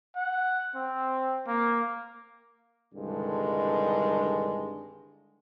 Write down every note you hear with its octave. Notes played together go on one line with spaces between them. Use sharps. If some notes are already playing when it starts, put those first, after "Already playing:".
F#5
C4
A#3
C2 G2 D3 D#3 G#3